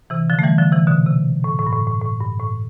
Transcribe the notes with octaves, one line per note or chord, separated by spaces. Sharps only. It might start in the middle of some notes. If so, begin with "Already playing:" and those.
C3 E3
D3 F3
A3
E3 G3
D3 F3
C3 E3
B2 D3
C3
A2
A2
G2
A2
A2
A2
G2
A2